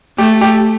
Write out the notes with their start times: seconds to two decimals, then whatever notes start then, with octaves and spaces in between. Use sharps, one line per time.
0.18 A3 G4
0.41 G4